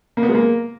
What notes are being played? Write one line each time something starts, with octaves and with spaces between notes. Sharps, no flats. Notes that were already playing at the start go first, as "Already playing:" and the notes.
A#3
B3
G#3
A#3